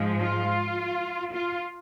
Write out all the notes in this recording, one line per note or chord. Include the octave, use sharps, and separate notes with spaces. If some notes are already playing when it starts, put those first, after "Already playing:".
Already playing: G#2 F3 G#3
F4
F4